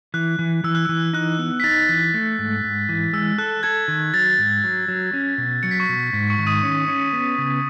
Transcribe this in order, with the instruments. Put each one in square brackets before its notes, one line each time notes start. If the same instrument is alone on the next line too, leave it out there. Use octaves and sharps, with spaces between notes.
[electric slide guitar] E3 [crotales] F#6
[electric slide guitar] E3
[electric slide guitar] E3 [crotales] E6
[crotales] F#6
[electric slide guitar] E3 [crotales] E6
[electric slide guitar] D#4 [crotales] F#6
[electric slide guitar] B3
[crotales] B6
[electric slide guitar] D#4 [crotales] A6
[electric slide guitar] E3 [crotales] B6
[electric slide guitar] A3
G#2
G#2
E3
[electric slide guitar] G#3 [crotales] E6
[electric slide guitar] A4 [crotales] F#6
[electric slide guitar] A4 [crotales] G#6
[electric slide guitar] D#3
[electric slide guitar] F#3 [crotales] A6
[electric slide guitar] G#2
F#3
F#3
C#4
B2
[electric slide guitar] F#3 [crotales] C#7
[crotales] B6
C#6 C#7
[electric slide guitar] B2
[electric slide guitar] G#2 [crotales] B6
[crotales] C#6 C#7
[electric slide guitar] D#3
[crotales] D#6 D#7
[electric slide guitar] C#4
C#4
B3
C#3